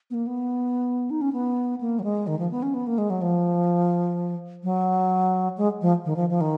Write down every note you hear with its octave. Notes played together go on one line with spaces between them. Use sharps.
B3
A#3
B3
D#4
C#4
B3
A#3
F#3
G#3
D#3
F3
B3
C#4
B3
A#3
G#3
F#3
F3
F#3
G#3
F3
D#3
F3
F3
D#3